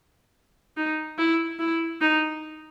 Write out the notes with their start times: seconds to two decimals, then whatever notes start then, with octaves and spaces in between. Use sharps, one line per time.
0.77 D#4
1.18 E4
1.59 E4
2.01 D#4